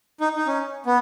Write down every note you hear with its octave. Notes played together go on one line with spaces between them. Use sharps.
D#4
D#4
C#4
B3